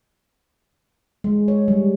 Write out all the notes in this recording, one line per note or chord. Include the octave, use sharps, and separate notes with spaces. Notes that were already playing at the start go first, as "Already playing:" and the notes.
G#3
C#5
G3